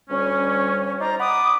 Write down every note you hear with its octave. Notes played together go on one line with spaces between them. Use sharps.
D2 G3 C#4
D#4 C5 D5 A#5
F#5 B5 D6 D#6